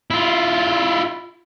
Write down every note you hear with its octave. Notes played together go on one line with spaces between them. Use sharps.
E4 F4